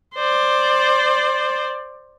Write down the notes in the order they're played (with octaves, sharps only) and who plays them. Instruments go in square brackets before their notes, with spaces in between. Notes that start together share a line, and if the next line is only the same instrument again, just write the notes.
[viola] C5 D5